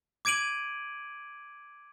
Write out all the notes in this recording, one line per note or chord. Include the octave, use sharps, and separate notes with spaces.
D6 G#6 D7 D#7 F#7